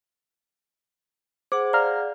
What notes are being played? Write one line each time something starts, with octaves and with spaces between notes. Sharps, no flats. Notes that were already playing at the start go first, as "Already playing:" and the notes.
G#4 C5 F#5 D6
D5 F5 A#5 F6